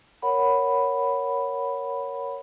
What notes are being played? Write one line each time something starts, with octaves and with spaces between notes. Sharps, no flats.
A#4 C#5 F#5 B5